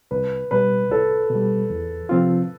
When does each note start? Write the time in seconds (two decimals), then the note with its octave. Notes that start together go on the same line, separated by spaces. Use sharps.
0.11 C2 B4
0.51 B2 G3 B4
0.90 C2 A4
1.30 B2
1.35 G3
1.70 E2
2.09 C3 F3 C4 F4